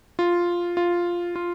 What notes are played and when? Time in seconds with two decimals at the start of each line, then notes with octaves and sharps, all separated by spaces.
0.19 F4
0.77 F4
1.36 F4